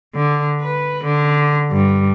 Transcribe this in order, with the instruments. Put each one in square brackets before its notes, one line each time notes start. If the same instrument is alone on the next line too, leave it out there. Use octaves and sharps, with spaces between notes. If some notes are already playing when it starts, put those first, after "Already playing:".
[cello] D3
B4
D3
G2